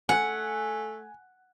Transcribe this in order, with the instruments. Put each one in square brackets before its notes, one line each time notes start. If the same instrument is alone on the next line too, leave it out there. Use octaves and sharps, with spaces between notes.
[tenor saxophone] A3 [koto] F#5 [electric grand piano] G#5